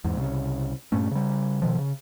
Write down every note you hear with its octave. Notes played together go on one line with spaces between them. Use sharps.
E2 G#2
C2 C#3
G2 A#2 A3 C#4
C#3 G3
B2 D#3 F3
C#3